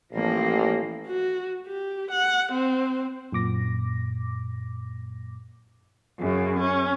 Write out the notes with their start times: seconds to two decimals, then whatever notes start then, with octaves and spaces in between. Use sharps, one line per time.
0.13 A1 F3 A#3
1.07 F#4
1.66 G4
2.11 F#5
2.52 C4
3.32 F#2 A#2 D6 A#6
6.19 F#2 C#3
6.59 C#4